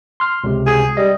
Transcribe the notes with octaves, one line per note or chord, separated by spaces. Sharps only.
C6 F6
C#2 C3
G#4
G3 D#5